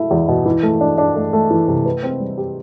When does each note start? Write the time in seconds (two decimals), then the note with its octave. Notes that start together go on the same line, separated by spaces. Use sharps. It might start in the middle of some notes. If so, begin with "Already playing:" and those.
Already playing: B2 A3 E4
0.11 E2
0.28 B2
0.46 E3
0.63 A3
0.81 D4
0.98 D4
1.15 A3
1.33 A3
1.51 E3
1.68 C3
1.86 B4
2.03 C4
2.20 G3
2.38 G4